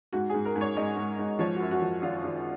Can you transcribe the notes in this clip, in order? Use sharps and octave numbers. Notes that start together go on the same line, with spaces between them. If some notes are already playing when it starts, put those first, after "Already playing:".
G#2 F#4
G#2 G#4
A#4
G#2
C#5
G#2 D#5
G#2
G#2
F3 C#5
F#4
F#2
F#4
F3
G#1 F4
G#1